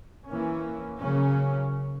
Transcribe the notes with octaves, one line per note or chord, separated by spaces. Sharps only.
E3 A#3 C#4
C#3 F#3 A#3 C#4